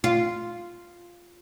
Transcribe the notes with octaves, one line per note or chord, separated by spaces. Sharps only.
F4